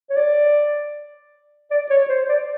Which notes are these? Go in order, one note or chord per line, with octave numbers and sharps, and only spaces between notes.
C#5
D5
D5
C#5
C5
D5